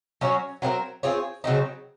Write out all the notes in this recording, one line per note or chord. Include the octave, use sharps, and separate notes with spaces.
F#3 C#4 F#4 C#5
F#3 C4 D#4 A#4
C4 F4 G#4 C#5
C#3 F#3 C4 D#4